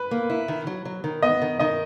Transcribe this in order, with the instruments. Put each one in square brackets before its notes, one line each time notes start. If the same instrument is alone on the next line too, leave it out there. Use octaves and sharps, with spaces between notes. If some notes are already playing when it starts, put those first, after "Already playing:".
Already playing: [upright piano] B4
[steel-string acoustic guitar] A#3
E4
D#3
F#3
F#3
D#3
[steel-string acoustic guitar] B3 [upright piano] D#5
[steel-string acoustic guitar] D#3
[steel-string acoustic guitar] D#3 [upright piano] D#5